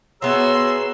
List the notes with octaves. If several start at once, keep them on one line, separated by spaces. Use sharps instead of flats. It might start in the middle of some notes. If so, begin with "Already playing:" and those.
B3 F#4 G#4 C#5 E5 A#5 C6 E6